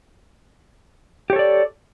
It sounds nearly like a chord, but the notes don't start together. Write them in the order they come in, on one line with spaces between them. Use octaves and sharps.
G4 C#5 A4 D5